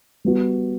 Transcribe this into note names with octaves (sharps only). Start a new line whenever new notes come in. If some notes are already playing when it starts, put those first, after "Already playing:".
G3 B3 F#4